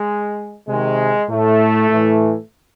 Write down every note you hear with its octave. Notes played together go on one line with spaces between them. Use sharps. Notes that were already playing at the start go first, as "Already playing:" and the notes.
Already playing: G#3
C3 D#3 G#3
A2 A3
A2 E3